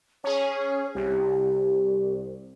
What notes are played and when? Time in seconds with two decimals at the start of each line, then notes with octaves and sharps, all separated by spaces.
0.24 C#4 G#4 C#5
0.95 C2 G4